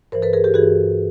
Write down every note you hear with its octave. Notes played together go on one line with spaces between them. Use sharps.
G2 E3 A#4 C5
A4 B4
G#4 A#4
G4 A4
G2 E3 F#4 G#4